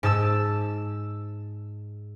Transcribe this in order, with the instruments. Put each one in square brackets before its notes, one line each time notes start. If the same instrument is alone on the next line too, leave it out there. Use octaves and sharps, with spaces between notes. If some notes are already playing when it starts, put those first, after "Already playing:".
[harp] G#2 A5 E6